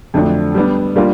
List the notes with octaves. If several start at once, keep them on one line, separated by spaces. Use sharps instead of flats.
F2 D3 F#3 A3 D4
G3 B3 D4
G3 A#3 D4 F4 A#4